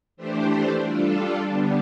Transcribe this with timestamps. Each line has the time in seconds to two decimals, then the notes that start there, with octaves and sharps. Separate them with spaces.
0.17 E3 A3 D4 G4 C5
0.82 G3 D4 F4 A4
1.48 D3 G3 B3 D4